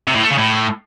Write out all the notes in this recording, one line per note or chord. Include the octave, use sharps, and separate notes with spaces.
C3
A2
A3
C#3
A2